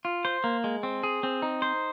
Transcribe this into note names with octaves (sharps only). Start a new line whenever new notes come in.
F4
C5
A#3
G#3
C4
G#4
C4
D#4
C5